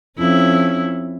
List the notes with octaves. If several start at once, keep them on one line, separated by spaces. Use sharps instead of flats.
F2 C#4 E4